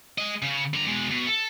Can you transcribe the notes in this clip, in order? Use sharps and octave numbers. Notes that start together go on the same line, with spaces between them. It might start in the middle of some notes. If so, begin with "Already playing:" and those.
G#3 D#5
C#3
D3 A#5
B2 G#3
B2
A4